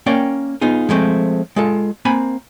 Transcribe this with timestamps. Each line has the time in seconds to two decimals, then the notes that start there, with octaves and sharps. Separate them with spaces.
0.06 A#3 C#4 D5 G5
0.61 B3 D#4 F4 G#4
0.89 F3 G#3 A3 C4
1.56 G#3 F4 A4
2.05 A#3 C4 G#5 B5